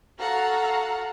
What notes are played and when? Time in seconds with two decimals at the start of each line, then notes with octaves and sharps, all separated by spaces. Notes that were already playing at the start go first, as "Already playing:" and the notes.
0.19 F#4 A4 F5 F#5 A#5